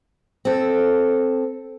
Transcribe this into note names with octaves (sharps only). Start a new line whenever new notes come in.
C4 A4